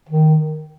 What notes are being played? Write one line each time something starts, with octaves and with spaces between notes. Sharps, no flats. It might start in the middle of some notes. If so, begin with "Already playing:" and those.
D#3